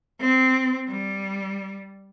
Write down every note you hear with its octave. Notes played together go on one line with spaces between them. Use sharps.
C4
G3